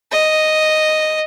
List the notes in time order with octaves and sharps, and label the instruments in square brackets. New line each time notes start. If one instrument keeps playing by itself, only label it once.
[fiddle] D#5